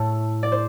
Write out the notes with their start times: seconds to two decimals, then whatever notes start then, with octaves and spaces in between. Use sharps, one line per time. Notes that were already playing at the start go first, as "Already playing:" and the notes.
Already playing: A2 A3
0.43 D5
0.52 C5